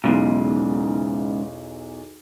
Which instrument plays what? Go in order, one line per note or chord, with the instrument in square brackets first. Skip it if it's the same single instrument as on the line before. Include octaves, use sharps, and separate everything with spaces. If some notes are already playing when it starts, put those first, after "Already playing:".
[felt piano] B1 E2 [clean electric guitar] G#2 C#3